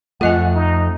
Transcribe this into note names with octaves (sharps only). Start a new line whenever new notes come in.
F2 A3 F4 D#5 F#5 G#5
D#4